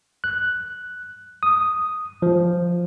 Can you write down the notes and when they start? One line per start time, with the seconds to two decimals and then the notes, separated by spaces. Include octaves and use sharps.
0.24 F#6
1.43 D#6
2.22 F3